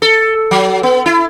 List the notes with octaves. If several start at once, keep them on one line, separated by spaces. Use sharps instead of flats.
A4
F#3
B3
E4